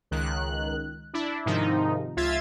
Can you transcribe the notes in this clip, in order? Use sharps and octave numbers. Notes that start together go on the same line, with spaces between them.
C#2 D#3 F#6
D4 E4
G#2 C3 D#3 F3 D#4
C#2 F4 E5 G#6 A6